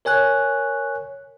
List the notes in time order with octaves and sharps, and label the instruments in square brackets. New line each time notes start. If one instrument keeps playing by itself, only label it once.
[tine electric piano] A#4 C#5 G#5 F#6